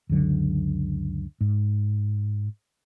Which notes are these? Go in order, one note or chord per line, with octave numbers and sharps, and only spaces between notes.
C#2 F#2 D3 F#3
G#2